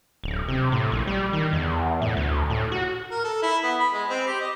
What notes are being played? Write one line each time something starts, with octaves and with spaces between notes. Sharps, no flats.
D1
C3
A2
A#1
G3
D#3
E2
A2
D2
A2
F#4
A#4
A4
E4
B3
B5
G#3
C4
G4
D#5